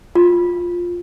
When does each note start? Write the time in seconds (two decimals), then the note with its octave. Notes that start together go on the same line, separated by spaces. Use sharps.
0.15 F4